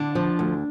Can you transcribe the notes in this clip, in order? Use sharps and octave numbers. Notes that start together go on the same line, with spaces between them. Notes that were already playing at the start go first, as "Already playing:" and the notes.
Already playing: D3 D4
F3
D2